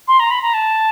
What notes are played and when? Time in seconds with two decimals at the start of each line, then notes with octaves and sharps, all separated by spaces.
0.08 C6
0.20 A#5
0.31 B5
0.42 A#5
0.54 A5